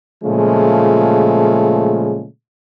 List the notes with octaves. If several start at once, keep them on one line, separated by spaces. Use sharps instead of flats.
A#2 C#3 F3 G#3 A3